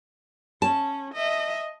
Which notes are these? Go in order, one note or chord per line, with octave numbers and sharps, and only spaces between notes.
C#4 A5
D#5 E5